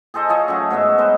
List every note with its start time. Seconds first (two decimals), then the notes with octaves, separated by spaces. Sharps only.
0.14 G#4 A4 C5 D#5
0.29 F4 G#4 C#5 D#5
0.48 F#3 A3 C#4
0.71 G#2 F#3 B3 E5
0.98 B3 B4 C5 D#5